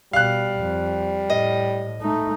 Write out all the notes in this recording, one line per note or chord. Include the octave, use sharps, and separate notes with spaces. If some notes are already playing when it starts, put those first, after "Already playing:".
B2 G3 F5 F#6
F2
A2 D#5
A3 D#4